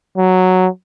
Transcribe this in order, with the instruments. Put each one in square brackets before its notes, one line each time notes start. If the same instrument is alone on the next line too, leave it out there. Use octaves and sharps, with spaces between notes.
[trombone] F#3